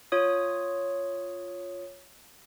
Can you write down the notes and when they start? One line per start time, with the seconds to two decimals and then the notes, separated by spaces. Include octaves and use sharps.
0.12 F4 C#5 D#6